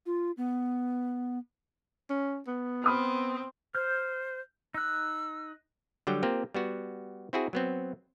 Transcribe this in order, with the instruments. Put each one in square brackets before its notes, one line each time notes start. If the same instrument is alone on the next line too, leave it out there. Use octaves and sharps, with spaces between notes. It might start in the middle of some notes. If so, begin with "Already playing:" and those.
[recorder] F4
B3
[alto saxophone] C#4
B3
[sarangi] C4 [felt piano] B5 D#6 F6
[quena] C5 [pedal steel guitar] F6 G6
[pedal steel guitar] D#4 F#6 [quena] E6
[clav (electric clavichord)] D3 F#3 G3 G5
A#3 C4 F4 G4
G3 B3 F#4
C4 E4 F#4 G#4
F#3 B3 C4